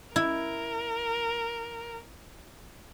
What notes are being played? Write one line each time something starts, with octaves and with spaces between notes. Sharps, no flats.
E4 A#4